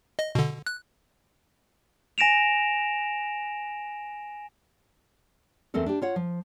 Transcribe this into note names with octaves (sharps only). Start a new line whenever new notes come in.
D#5
B2 D3
F#6
G#5 A#6 D7 E7 F7
E2 A3 C4 A4 A#4
D4 G4
F4 C#5 F#5
F3